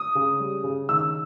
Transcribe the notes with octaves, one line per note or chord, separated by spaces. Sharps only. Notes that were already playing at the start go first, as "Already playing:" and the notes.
Already playing: D#6
C#3
G3
C#3
D#3 E6